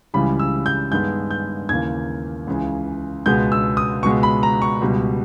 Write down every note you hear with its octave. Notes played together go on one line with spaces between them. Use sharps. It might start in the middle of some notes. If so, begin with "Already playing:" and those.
C#2 C#3 E3 G3 B5
E6
G6
G2 D#3 G#3 B3 G6
G6
D#2 C#3 E3 A#3 G#6
C#2 C#3 E3
C#2 B2 G#3 B3 G6
E6
D#6
C#2 B2 G#3 B3 C#6
B5
A#5
C#6
C#2 B2 G3 B3